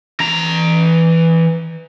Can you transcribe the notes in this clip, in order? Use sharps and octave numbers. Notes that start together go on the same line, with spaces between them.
E3 A#5